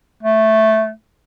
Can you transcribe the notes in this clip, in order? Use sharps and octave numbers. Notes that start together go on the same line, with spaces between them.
A3